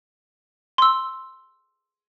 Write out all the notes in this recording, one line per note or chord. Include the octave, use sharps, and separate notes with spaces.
C6 E6